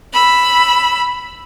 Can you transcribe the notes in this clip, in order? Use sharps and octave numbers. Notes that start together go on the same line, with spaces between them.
B5 E6